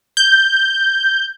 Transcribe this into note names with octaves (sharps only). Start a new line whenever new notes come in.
G6